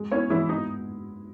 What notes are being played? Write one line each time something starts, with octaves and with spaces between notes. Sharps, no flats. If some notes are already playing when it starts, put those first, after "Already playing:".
Already playing: G#3
B3 C#4 E4 C#5
E3 G#3 E4
B3 D#4 E4